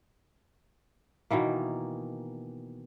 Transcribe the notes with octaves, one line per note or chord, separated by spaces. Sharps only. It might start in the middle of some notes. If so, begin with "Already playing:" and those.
B2 D#3 E3 A#3